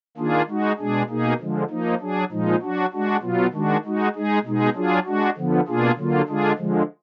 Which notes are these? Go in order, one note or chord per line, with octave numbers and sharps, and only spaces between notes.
D#3 A#3 D4 F4 G#4
G#3 D#4 F#4
B2 G#3 D4 G#4
B2 A#3 D#4 G#4
D3 F3 G#3
F3 A#3 D#4
F#3 D4 G#4
A#2 F3 G#3 D#4
F#3 D4 F#4
G#3 D4 F#4
B2 F#3 B3 F4
D#3 G#3 D4 F#4
G#3 D#4 F#4
G#3 D#4 G#4
B2 G#3 D#4 G#4
F#3 D4 F4 G#4
G#3 D4 F#4
D3 F3 B3
B2 A#3 D4 F4 G#4
D3 F#3 A#3 F4
D3 G#3 D4 F4 G#4
D3 F3 G#3